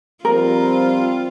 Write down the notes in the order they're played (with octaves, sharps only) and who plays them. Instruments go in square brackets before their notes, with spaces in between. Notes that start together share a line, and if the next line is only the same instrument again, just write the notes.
[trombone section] F3 G3 C4 [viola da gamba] F4 [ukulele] A#4